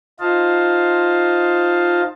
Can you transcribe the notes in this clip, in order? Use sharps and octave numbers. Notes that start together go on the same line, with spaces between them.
D#4 F4 C5 D#5 F5 A5